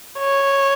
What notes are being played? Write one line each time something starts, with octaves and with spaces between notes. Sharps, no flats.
C#5